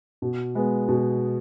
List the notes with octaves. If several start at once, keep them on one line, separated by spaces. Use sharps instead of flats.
B2
G#3 B3
B2